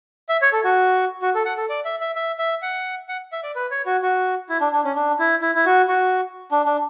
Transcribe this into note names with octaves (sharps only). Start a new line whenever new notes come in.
E5
C#5
A4
F#4
F#4
A4
F#5
A4
D5
E5
E5
E5
E5
F#5
F#5
E5
D5
B4
C#5
F#4
F#4
E4
D4
D4
C#4
D4
E4
E4
E4
F#4
F#4
D4
D4